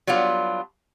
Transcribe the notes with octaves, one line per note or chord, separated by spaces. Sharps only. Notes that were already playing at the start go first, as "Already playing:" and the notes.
F#3 G3 B3 D4 F4